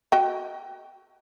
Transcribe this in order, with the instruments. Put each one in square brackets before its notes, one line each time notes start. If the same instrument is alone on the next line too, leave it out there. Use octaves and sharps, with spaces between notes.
[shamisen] F#4 D#5 G5